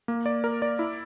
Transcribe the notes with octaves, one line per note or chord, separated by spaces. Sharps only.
A#3
D5
A#4
D5
E4